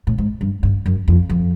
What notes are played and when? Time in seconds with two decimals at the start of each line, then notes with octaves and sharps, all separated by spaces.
0.07 A2
0.18 G#2
0.41 G2
0.63 G2
0.86 F#2
1.08 F2
1.29 F2